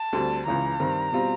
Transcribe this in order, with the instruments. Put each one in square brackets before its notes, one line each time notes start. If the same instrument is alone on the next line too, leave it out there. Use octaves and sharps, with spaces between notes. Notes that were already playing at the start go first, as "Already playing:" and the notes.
Already playing: [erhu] A5
[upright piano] D2 D3 G3 C4
[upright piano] C#2 C#3 E3 [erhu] A#5
[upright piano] G2 D#3 G3 C4
B2 G3 C4 F4